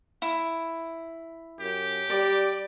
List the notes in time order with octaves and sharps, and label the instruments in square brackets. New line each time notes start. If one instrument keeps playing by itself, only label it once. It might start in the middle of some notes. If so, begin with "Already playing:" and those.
[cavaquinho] E4
[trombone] F#2 [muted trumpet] G4
[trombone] G3 [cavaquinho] D5